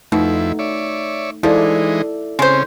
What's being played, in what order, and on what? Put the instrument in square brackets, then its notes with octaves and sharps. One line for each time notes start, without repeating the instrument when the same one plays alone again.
[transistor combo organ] F2 E4 [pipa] B2 [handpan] A3 D#4
[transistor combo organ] C#5 D5 E5
[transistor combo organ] E3 G#3 D#4 [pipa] F3 [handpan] E4 A4 D5
[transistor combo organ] C#3 C4 C#4 [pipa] G#3 C5